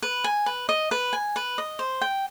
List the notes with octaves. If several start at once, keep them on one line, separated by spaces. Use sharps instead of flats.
B4
G#5
B4
D#5
B4
G#5
B4
D#5
C5
G5